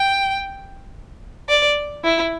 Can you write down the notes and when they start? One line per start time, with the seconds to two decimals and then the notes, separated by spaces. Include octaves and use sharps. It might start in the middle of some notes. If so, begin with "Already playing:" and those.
Already playing: G5
1.49 D5
2.04 E4